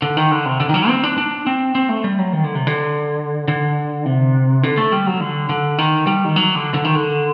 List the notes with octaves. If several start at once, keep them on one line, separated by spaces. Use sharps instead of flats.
D3
D#3
D3
C3
D3
D#3
F#3
C4
D4
D4
C4
C4
A3
G3
F#3
D#3
D3
C3
D3
D3
C3
D3
A3
G3
F#3
D3
D3
D#3
G3
D#3
F#3
D3
D3
D#3
D3